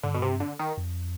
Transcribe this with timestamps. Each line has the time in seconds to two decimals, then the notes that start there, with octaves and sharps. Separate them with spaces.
0.03 G2 D3
0.15 B2
0.22 C3
0.40 D3
0.59 D#3
0.78 F2